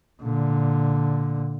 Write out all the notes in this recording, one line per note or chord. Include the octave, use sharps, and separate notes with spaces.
A#2 D3